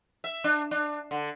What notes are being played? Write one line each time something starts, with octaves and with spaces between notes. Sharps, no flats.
E5
D4
D4
D3